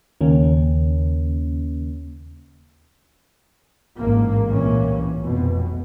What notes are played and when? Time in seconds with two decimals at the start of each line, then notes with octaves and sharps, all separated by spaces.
0.21 D#2 C#3 A#3 C#4
3.96 A1 G#2 A#3
4.48 C2 A#2 E3 A#3 C#4
5.21 F1 B1 B2